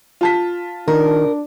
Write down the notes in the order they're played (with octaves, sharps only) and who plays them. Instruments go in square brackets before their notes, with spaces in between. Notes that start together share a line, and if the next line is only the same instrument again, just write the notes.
[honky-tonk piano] F4 A5 B6
[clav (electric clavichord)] D#3 [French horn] D4 [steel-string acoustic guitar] A#4